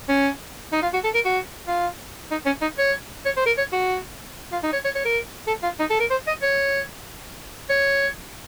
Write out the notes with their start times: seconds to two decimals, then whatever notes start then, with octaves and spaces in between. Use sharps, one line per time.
0.09 C#4
0.73 D#4
0.82 F4
0.94 F#4
1.04 A4
1.15 A#4
1.25 F#4
1.68 F4
2.31 D#4
2.46 C#4
2.62 D#4
2.78 C#5
3.26 C#5
3.37 C5
3.46 A#4
3.58 C#5
3.73 F#4
4.53 F4
4.63 D#4
4.73 C#5
4.85 C#5
4.95 C#5
5.05 A#4
5.47 A4
5.63 F4
5.80 D#4
5.90 A4
6.00 A#4
6.11 C5
6.27 D#5
6.42 C#5
7.70 C#5